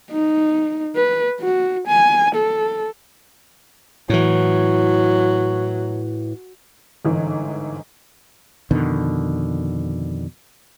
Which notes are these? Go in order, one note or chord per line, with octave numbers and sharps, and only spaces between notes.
D#4
B4
F#4
G#5
A4
A2 E3 F#3
G1 G#2 E3
F2 B2 D3 D#3